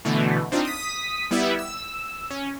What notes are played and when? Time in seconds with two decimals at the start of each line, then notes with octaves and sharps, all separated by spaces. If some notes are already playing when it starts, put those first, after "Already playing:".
0.05 B2 D3 E3 A3
0.52 C4 D4 D#4 F4
0.65 D#6 B6
1.31 G3 B3 E4 E5
1.59 E6
2.30 C#4